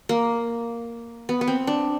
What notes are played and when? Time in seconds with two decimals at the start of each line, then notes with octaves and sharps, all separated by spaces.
0.09 A#3
1.29 B3
1.41 B3
1.48 C4
1.67 D4